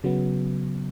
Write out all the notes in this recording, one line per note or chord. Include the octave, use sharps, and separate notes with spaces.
C#3 F#3 B3